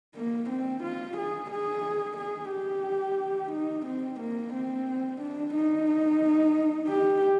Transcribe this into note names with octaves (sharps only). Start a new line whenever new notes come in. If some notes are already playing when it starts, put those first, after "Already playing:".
A#3
C4
F4
G#4
G#4
G#4
G4
D#4
C4
A#3
C4
D4
D#4
G4